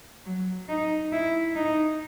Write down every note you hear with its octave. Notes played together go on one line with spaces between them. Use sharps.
F#3
D#4
E4
D#4